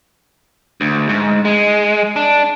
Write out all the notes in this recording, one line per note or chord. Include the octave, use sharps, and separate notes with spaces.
D2
G#2
G#3
D4